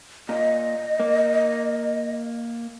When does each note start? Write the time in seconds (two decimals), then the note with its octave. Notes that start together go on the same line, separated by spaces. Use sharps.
0.29 A#2 D#5
1.00 A#3